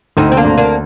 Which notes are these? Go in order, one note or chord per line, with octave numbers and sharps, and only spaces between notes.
D2 C4 D#4
C4
A#3 D4
D2
A#3 D4